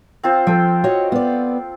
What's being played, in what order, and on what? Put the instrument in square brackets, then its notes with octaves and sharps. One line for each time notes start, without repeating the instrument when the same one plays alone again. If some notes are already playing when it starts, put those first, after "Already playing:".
[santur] C4 F4 C5
[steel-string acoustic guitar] F3 [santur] A4 G5
[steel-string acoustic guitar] F#4 C#5 D#5
B3 D5